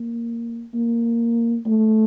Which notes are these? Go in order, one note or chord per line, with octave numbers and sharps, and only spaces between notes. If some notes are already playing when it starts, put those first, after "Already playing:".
Already playing: A#3
A#3
A3